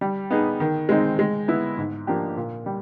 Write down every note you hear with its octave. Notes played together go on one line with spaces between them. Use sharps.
G3
B3 D#4 G#4
D#3
G#3 C4 D#4
G#3
B3 E4
G#2
F3 A#3 D4 G4
A#2
G3